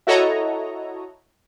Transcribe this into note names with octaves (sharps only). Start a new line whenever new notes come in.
E4 F#4 A4 C#5 D#5 A#5